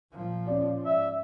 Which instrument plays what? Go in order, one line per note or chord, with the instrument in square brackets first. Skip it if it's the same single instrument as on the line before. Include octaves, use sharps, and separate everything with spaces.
[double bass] A#2 F3
[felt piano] C#4 D5
[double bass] G#2 [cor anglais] E5